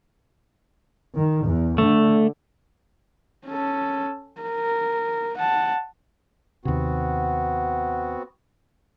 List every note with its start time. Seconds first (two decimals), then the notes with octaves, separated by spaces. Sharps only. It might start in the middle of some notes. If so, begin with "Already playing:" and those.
1.15 D#3
1.45 E2
1.78 D3 A3
3.47 C#4 A4
4.41 A#4
5.37 F#5 A5
6.65 D#2 C3 B3 C4 F#4